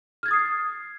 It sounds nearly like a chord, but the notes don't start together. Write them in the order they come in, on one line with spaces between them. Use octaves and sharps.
F6 G#6 A6 D#6 C7